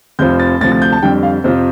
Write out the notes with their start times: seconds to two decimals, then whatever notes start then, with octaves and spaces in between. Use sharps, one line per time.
0.19 F1 F2 F3 G6
0.40 A6
0.61 D2 C3 F3 A6
0.72 A6
0.82 G6
0.92 A5
1.03 F2 D3 G3 G5
1.23 F5
1.44 F2 C3 F3 C5